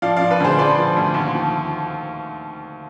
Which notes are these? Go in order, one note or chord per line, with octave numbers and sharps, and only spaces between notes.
F3 D5 F5
D5 F5
F3
B4
D2 G#4 C5
F3 B4 D5
F3
D2
D#2
F3